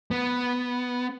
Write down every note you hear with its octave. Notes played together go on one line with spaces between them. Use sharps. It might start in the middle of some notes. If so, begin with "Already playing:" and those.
B3